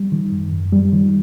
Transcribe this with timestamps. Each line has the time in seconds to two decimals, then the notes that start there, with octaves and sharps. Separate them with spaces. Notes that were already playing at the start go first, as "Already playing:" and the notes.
Already playing: G3
0.12 D#3
0.32 F#2
0.52 F#2
0.73 G3
0.93 D#3